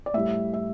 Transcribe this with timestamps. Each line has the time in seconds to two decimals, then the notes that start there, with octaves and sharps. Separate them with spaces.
0.06 D5
0.14 A2 G3 E5
0.54 E5